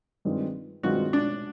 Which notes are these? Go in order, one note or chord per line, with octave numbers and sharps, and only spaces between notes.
G2 D#3 G#3 C4 F4
G2 D#3 G#3 C4 F4 F#4
D4